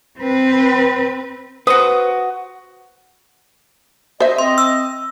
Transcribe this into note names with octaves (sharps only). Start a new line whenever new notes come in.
C4 B4
F#4 B4 C5 D#6
C5 D#5 E5
C4 D#5 C6
E6